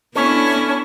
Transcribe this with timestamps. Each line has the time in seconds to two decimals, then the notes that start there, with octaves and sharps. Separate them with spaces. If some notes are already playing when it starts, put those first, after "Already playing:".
0.15 B3 C#4 D4 E4 A4 C#5